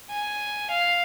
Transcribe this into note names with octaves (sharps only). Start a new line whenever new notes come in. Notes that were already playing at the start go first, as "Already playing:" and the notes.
G#5
F5